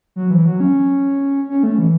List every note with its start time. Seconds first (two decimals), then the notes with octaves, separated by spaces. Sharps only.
0.16 F#3
0.31 E3
0.45 F#3
0.60 C#4
1.49 C#4
1.63 A3
1.78 E3